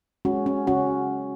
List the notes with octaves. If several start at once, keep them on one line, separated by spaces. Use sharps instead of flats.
G#3 C#4 F#4
C#4
C#3 C#4 F#4